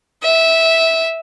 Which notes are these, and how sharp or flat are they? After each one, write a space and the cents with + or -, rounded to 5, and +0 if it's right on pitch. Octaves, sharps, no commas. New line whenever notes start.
E5 -10